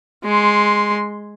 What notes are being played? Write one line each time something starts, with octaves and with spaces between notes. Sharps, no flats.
G#3 C6